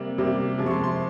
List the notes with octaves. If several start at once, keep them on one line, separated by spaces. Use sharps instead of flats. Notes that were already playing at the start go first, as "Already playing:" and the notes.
Already playing: C3 G3 A#3
C3 G3 A#3
C3 F3 G#3
C#6
C6
C6